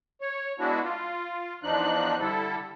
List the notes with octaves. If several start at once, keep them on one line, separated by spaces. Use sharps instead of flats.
C#5
G#3 B3 D4 E4 F#4
F4
E2 F3 D4 D#4 F#6
D3 G3 E4 A4